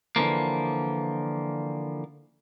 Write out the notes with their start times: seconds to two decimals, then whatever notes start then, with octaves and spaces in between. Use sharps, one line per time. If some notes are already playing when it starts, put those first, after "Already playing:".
0.16 D3 E3 F3 A#3